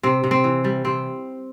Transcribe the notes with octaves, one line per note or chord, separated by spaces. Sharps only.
C3 C4
C3
C4
E3
G3
C3 C4